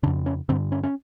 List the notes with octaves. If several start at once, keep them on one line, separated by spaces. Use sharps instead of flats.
F2 C#3 D4
C#4
G2 D3 C4
C#4
C#4